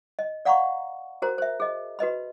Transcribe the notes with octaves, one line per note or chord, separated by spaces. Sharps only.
D#5
D5 F5 F#5 A#5 B5 C#6
F#4 A#4 C5 A#5
C5 E5
G#4 D#5
F#4 B4 D#5 B5